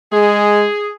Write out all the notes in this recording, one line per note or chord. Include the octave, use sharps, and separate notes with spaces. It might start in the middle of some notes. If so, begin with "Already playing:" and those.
G#3 G#4